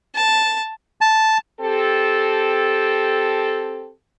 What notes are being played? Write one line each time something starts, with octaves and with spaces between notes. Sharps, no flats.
A5
A5
C4 G4 A4